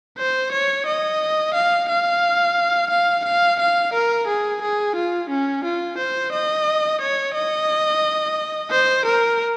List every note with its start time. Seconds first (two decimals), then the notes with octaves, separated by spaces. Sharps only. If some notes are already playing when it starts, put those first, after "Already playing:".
0.18 C5
0.52 C#5
0.86 D#5
1.54 F5
1.89 F5
2.90 F5
3.25 F5
3.59 F5
3.93 A#4
4.27 G#4
4.61 G#4
4.96 F4
5.30 C#4
5.64 F4
5.98 C5
6.32 D#5
7.01 C#5
7.35 D#5
8.71 C5
9.05 A#4